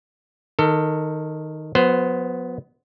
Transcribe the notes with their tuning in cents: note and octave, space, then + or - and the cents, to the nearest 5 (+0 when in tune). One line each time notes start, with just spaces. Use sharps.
D#3 +0 A4 +25
F#3 -45 B3 +0 C5 -15